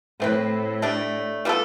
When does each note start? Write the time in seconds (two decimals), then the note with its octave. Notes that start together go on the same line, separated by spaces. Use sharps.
0.20 A2 A3 C4 E4 B4
0.82 A3 D4 G4
1.45 G3 B3 F4 A4